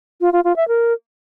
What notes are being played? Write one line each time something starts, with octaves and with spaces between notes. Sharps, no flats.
F4
F4
F4
E5
A#4